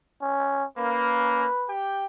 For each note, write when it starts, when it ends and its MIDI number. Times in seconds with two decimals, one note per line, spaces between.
0.22 0.65 61
0.78 1.47 58
0.78 1.47 61
0.78 1.73 71
1.69 2.05 67
1.69 2.05 79